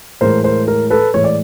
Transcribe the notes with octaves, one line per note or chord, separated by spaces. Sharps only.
A2 E3 G#3 A#4 C5
A#4 C5
A#4
A4 B4
A2 E3 G#3 C#5
D5